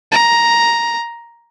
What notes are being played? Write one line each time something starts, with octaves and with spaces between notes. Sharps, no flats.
A#5